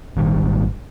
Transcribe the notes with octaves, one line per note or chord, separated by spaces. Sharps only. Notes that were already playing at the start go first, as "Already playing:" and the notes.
G#1 A#2 D#3 G3